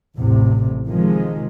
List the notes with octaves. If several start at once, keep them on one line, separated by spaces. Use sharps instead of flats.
A1 E2 A2 C3
C3 D#3 F3 G#3